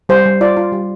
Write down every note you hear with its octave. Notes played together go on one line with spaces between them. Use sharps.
G3 C5
G3
F4 D5
F4
G3